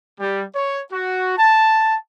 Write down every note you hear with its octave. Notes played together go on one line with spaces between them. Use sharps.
G3
C#5
F#4
A5